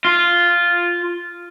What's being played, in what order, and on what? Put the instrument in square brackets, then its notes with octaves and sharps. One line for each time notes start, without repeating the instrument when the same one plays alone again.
[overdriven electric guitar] F4